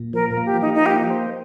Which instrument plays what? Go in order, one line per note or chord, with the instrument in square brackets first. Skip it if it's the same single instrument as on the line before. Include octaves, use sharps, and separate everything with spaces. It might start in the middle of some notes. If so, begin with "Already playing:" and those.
Already playing: [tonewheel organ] A#2
[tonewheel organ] F3 [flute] A#4
[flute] A#4
[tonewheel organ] A#3
[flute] G4
[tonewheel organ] F3 [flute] D#4
[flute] D#4
[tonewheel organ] A#3 [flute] G4
[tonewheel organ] C5